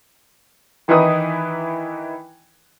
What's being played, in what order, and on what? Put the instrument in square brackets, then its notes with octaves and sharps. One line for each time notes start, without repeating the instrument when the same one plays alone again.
[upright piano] D#3 E3 D#4 E4 B4 D#6